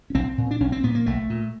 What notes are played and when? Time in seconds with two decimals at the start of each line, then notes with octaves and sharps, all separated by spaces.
0.10 C#4
0.15 B1 C4
0.38 A#2
0.51 D4
0.60 B1 C#4
0.72 C4
0.83 A#2 B3
0.95 A#3
1.06 B1 A3
1.30 A#2